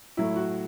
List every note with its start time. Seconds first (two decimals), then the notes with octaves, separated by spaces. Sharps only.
0.17 A2 F#3 A3 E4
0.36 F#4